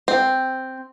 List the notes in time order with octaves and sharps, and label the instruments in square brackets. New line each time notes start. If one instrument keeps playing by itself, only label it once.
[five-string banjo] C4